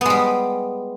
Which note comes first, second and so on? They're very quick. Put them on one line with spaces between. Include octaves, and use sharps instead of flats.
B3 G#3 G3